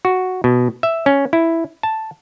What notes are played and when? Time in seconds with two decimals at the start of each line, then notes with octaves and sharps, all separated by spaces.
0.05 F#4
0.44 B2
0.83 E5
1.06 C#4
1.33 E4
1.83 A5